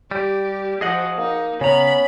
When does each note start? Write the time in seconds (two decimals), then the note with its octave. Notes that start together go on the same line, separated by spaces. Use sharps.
0.11 G3 G4
0.81 F3 F#4 G#4 D#5 F#5
1.18 A#3 D#4
1.61 C#3 B3 C#4 A#5 B5